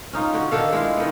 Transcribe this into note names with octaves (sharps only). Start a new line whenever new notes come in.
C#4 D#4 F4
D3 F#4
D#3 D4 A4 F5
G#3 E4 F4
D#3 B3